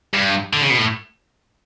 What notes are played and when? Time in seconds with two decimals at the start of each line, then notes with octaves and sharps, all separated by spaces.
0.14 G2
0.53 D3
0.62 C#3
0.70 B2
0.78 A2